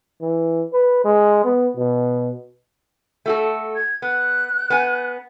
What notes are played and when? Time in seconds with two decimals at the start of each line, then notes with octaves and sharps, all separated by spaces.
0.21 E3
0.73 B4
1.05 G#3
1.45 B3
1.77 B2
3.26 A3 F#4 A4
3.75 G#6
4.02 B3 F#6
4.70 B3 G#5